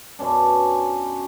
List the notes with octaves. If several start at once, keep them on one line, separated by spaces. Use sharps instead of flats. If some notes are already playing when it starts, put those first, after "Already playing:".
F#2 B2 C#4 D4